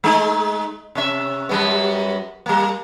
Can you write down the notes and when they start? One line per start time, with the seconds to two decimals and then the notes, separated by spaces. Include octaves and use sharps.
0.04 G#3 D#4
0.95 C3 C#4 E5
1.49 F#2 G3 B3
2.46 G3 A#3